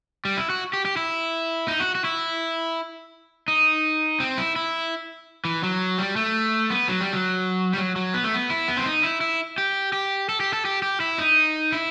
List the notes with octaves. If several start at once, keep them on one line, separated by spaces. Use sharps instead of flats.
G3
E4
F#4
G4
G4
E4
D#4
F#4
F#4
E4
D#4
C4
E4
E4
E3
F#3
G3
A3
B3
F#3
G3
F#3
G3
F#3
F#3
B3
A3
B3
E4
B3
C4
D#4
E4
E4
G4
G4
A4
G4
A4
G4
G4
E4
D#4
E4